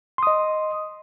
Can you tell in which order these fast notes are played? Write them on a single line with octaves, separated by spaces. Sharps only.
C6 D#6 D#5